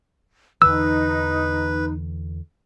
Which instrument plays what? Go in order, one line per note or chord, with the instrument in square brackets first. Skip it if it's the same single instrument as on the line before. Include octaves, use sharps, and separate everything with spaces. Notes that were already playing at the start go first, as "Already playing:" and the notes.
[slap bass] E2 D3 E3 [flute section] D#4 [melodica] B4 [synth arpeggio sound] E6